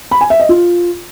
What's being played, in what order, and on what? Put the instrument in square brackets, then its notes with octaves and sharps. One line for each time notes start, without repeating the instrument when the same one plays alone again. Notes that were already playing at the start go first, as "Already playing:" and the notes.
[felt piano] B5
G#5
E5
D#5
F4